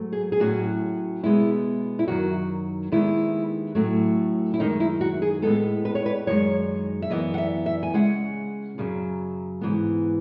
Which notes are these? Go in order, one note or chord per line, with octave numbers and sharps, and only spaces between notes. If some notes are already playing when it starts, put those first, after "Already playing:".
Already playing: G#2 F#3 A3
G#4
G#4
A2 F#3 C#4 F#4
B2 G#3 B3 E4
E4
F#2 D#3 F#3 F#4
D#2 D#3 G#3 B3 E4
A2 F#3 A3 C#4
E4
F#2 D#3 G#3 C#4 D#4
E4
F#4
G#4
A2 G#3 B3 A4
B4
C#5
B4
F#2 D#3 G#3 C#5
E5
F#2 E3 B3 D#5
F#5
E5
E5
G#5
C#3 G#3 C#4 F#5
F#2 C#3 F#3
G#2 E3 B3